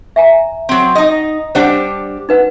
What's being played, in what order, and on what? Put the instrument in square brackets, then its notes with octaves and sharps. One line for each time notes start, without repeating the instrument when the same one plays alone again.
[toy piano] E5 G#5 A#5
[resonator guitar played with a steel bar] F#3 C4
D#4 D#5
[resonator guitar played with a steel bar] G3 D4 G4 [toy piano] C5 F#5 A5
[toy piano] D#4 B4 F#5